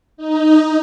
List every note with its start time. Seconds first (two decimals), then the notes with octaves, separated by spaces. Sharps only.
0.17 D#4